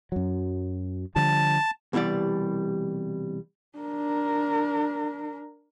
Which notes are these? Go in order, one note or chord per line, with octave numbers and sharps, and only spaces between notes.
F#2 F#3
D3 F3 G3 A5
C2 B2 E3 G3 D5
D4 A#4